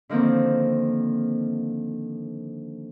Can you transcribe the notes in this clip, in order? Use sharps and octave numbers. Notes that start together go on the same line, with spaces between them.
D3 D#3 F3 A#3 C4